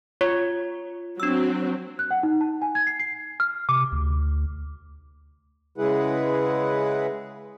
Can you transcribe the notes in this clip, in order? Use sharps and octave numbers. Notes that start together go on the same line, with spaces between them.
F4 C#5
F#3 C4 D4 E6
F#6
F#5
D#4
A5
G#5
G#6
C7
C7
F6
C3 D6
D2
C#3 G#3 E4 G#4 B4 F#5